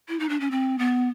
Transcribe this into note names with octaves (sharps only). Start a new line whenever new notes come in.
E4
D#4
D4
C#4
C4
B3